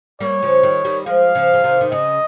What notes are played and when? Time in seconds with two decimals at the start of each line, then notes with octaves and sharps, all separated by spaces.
0.20 G3 A#3 C#5
0.42 C#3 F3
0.63 D#3 G3
0.85 D#3 G3
1.06 F3 G#3 F5
1.35 C#3 F3
1.54 C#3
1.64 C3 D#3
1.81 D#3
1.92 C#3 D#5